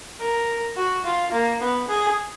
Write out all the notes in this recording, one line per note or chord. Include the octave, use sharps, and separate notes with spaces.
A#4
F#4
F4
A#3
B3
G#4